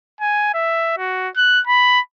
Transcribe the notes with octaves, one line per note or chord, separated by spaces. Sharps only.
G#5
E5
F#4
F#6
B5